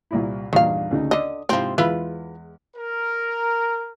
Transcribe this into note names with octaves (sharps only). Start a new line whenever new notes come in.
C2 A#2 E4
E2 G2 A#2 D#3 F5
D2 C#3 D#4
D3 D#5 D#6
G#2 C3 F3 C4 E4
E2 G#3 E4 F4 B4
A#4